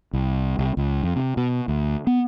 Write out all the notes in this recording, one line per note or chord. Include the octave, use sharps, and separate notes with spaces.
C2
C2
C#2
F2
C3
B2
D2
B3